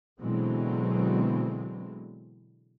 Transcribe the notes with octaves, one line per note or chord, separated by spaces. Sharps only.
B2 D3 E3 F#3 G#3 C4